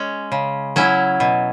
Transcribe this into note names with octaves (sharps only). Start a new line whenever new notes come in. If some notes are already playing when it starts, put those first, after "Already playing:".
Already playing: G#3 C#4
C#3
F#3 C#4 E4
B2